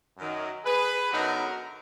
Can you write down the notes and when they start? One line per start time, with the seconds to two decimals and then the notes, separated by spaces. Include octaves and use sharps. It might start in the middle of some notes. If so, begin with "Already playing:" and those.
0.17 F#2 D#3 F#3
0.64 G#4 B4
1.11 F#2 D3 F#3 B3 D#4 F#4 A#4